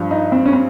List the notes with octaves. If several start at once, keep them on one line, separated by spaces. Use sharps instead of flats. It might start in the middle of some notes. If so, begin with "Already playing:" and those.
Already playing: G2 F3
D#4
C4
C#4
C4